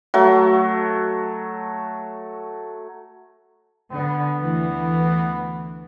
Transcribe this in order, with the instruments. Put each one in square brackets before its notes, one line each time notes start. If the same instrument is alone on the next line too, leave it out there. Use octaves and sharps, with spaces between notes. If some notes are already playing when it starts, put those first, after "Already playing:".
[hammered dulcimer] F#3 A3
[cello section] D3 [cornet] B3
[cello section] D2 E3